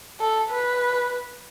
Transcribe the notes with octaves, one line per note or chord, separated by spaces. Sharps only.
A4
B4